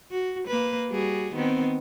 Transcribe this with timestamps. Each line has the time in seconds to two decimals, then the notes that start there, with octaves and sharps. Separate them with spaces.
0.11 F#4
0.48 A#3 B4
0.90 G3 F#4 G#4
1.34 D#3 B3 C4